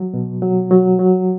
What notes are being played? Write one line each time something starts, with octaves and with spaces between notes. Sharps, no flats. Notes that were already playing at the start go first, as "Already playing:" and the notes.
Already playing: F#3
B2
F#3
F#3
F#3